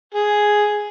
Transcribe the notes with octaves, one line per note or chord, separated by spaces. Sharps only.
G#4